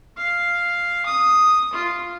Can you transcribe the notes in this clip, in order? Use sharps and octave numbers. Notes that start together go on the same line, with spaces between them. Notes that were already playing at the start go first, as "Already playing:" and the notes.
F5
D#6
F4